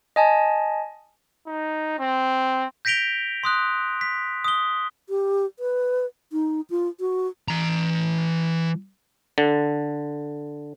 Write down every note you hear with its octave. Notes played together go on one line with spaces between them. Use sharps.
D#5 G#5 A5
D#4
C4
G6 A#6 B6 D7 F7 G7
C6 D#6 F#6
B6
D#6 G7
G4
B4
D#4
F4
F#4
E3 A#5
D3